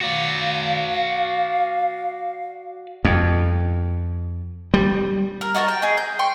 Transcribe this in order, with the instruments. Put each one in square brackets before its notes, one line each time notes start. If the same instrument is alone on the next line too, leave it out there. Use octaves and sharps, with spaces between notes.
[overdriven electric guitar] F#4 D5 [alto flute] F5
[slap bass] F2
G3
[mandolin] A#4
D#4 F#4 A#4 A5
G5
D#4 G#4
G6
G5 C6 C#6